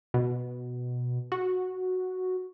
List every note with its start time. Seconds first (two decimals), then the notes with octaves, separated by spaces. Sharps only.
0.14 B2
1.32 F#4